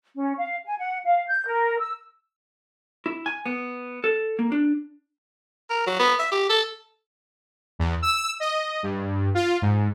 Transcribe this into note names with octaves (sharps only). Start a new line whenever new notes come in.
C#4
F5
G#5
F#5
F5
G6
A#4
E6
E4
G#5
B3
A4
A#3
D4
A#4
F#3
B3
E5
G4
A4
E2
E6
D#5
G2
F4
G#2